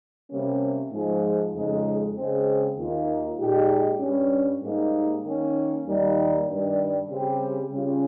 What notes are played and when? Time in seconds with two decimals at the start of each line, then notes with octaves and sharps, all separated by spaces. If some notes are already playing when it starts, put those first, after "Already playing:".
0.30 C3 G3 A#3 C#4
0.91 G#2 F3 G#3
1.54 F2 C#3 G#3 D#4
2.15 C#3 G#3 C4
2.77 D#2 D#3 A#3 F4
3.39 A#2 G#3 D#4 G4
4.00 G2 G3 C#4
4.62 G#2 G3 A#3 D#4
5.25 D#3 A#3 C#4
5.86 D#2 D#3 G3 A#3
6.47 G2 D#3 G3
7.09 C#3 G3 C4 G4
7.71 C#3 G3 C#4 F4